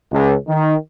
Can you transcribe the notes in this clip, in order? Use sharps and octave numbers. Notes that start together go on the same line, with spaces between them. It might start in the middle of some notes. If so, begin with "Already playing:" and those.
C#2
D#3